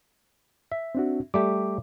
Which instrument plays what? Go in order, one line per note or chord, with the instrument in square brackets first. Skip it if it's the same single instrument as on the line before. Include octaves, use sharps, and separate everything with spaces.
[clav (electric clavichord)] E5
[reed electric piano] C4 D4 F#4
[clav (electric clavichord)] G3 A3 G4 [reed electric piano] D6